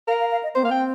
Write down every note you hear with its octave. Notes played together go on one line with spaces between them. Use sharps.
A#4 F5
F5
F5
D#5
C4 C5
A#3 F5
C4 G5